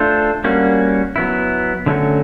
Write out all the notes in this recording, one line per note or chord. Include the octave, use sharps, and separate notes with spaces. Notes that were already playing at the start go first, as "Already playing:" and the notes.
Already playing: A3 D4 F4 A4 C5
G3 A#3 C#4 F#4
F#3 B3 E4
D3 F#3 A3 C#4 F#4